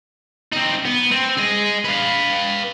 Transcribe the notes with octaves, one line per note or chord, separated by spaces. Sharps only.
C4 D#4
B3
C4
G#4 D#5
B4 F5